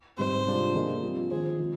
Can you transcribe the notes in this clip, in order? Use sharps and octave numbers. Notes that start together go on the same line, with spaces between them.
G#2 G3 C4 C5
C3 G3 D4 F4 G#4
F3 A#3 F4 G#4 D#5
G3 C4 F4
D#3 G#3 C4 F4 G#4 C5
F3